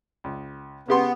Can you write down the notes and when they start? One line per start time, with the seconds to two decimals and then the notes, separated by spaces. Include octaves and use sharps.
0.24 C#2
0.88 C#3 B3 G4 C6